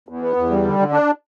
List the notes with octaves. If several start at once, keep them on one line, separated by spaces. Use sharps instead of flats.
E2
B3
E2
G3
D3
D3
D4